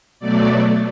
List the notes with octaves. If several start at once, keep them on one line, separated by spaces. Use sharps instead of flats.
B2 F#3 A3 D5